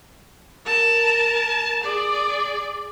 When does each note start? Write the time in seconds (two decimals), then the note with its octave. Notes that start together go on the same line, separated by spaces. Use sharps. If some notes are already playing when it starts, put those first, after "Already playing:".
0.65 A#4 A5
1.83 G#4 D5